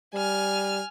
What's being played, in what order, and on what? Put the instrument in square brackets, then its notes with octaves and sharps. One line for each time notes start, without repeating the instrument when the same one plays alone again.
[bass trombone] G3 [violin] G#5 F6